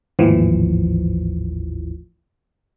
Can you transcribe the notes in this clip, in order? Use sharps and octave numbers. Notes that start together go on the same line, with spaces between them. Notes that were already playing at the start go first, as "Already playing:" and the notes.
G#1 D#2 A2 E3 F3